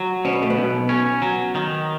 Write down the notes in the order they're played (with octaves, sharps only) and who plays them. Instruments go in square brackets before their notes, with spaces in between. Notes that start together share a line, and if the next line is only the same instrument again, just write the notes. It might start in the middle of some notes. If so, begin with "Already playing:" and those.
Already playing: [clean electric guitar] F#3
[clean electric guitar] B2 [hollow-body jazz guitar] C#4
[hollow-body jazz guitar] B3
A3
B3
[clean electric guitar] B1
C#4
F#3
D#3